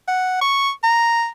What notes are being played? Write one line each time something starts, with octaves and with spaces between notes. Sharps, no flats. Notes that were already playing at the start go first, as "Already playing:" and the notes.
F#5
C#6
A#5